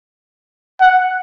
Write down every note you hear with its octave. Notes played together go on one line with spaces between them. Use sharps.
F#5